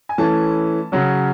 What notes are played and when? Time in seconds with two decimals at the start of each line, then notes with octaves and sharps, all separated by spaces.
0.09 G#5
0.18 E3 A3 C#4 A5
0.92 C#3 F#3 C#4